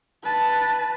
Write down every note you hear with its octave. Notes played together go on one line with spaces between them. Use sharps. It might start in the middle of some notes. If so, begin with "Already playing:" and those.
B4 A5